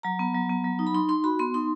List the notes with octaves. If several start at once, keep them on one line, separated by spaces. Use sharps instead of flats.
F#3 A#5
B3
F#3
B3
F#3
D#4
B5
D#4 C6
D#4 C6
F#4 B5
B3 C6
D#4 C6